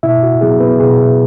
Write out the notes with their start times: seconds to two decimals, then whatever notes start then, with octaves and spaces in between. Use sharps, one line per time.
0.03 B2 E4 E5
0.23 F#4
0.41 F#3 B3 E4 G#4
0.60 B3 B4
0.80 B2 G#4